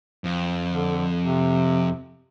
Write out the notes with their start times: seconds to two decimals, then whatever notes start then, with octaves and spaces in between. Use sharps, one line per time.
0.24 F2
0.70 D3
1.22 C3